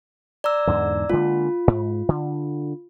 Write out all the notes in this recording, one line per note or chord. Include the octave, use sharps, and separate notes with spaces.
D5 A#5 E6
E2 G#2 D3
D3 G#3 A#3 F4
G#2
D3